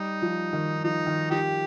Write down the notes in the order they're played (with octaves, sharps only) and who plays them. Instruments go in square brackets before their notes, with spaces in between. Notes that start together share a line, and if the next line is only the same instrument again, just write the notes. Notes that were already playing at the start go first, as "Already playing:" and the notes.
Already playing: [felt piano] G3 [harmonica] D#4
[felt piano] F3
D#3
[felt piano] F3 [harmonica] D#4
[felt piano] D#3
[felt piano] F3 [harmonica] D#4 G4